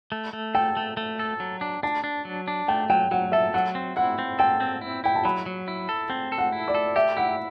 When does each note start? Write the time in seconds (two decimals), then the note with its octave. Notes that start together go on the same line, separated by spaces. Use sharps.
0.12 A3
0.33 A3
0.55 A4 G5
0.77 A3
0.97 A3
1.19 A4
1.40 F#3
1.61 D4
1.83 D4 A5
2.04 D4
2.25 F#3
2.48 D4
2.68 A3 G5
2.90 F#3 G5
3.11 F#3 F#5
3.32 A4 E5
3.54 F#3 F#5
3.75 C4
3.96 E4 F#5
4.19 C4
4.39 A4 G5
4.60 C4
4.81 E4
5.04 E4 G5
5.15 A5
5.25 F#3 B5
5.46 F#3
5.68 E4
5.89 A4
6.10 C4 G5
6.32 A4
6.38 F#5
6.52 E4
6.68 D5
6.75 A4
6.96 G4 E5
7.17 E4 F#5